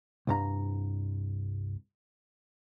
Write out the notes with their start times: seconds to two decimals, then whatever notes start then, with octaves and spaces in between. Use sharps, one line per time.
0.27 C2 G2 A#5